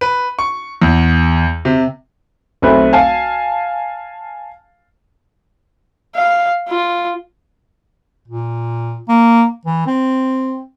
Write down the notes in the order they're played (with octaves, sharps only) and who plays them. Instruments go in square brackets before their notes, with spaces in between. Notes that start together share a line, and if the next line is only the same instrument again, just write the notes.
[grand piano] B4
C#6
E2
C3
[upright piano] B1 A3 C4 B4
F5 G#5 A5
[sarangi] F5
F4
[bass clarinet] A#2
A#3
E3
C4